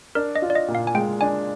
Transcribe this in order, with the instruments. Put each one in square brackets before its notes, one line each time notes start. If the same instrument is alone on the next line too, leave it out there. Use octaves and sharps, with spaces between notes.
[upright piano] D4 [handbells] A#4
[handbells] D#5
[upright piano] F4
[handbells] D5
D#5
[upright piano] A#2
[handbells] F5
G#5
[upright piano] G#3 [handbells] G5
[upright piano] D4 [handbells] G#5